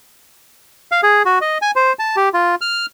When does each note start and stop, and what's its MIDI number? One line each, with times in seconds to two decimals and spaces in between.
0.92 1.01 77
1.03 1.23 68
1.25 1.39 66
1.41 1.58 75
1.62 1.71 80
1.76 1.93 72
1.99 2.16 81
2.16 2.29 67
2.34 2.55 65
2.61 2.86 89